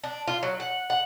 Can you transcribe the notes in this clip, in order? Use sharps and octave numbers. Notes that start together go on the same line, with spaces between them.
D4
F4
F#3
F#5
F#5